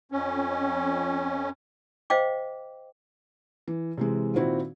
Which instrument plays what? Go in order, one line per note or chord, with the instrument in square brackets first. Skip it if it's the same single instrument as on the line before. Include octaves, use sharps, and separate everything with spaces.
[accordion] F2 C#4
[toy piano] C5 D#5 F5 G5 D6
[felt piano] E3
C3 E3 G#3
A#2 D#3 C4 E4 F#4